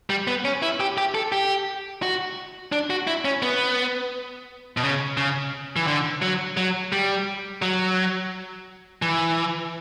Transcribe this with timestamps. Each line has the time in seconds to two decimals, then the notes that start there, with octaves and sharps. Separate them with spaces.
0.10 G3
0.27 B3
0.45 C#4
0.62 E4
0.80 G4
0.98 G4
1.15 A4
1.32 G4
2.02 F#4
2.72 D4
2.90 F#4
3.07 E4
3.25 C#4
3.42 B3
4.77 B2
4.83 C#3
5.17 C#3
5.76 E3
5.87 D3
6.22 F#3
6.57 F#3
6.92 G3
7.62 F#3
9.02 E3